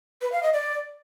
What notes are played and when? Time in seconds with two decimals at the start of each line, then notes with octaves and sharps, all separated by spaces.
0.22 B4
0.32 F5
0.43 D#5
0.53 D5